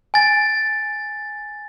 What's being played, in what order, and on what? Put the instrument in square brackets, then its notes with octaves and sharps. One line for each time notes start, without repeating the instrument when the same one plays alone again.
[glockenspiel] G#5 A6